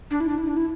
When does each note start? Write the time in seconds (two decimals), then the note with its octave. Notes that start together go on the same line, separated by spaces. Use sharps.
0.11 D4
0.20 E4
0.29 D4
0.38 E4
0.48 D4
0.57 E4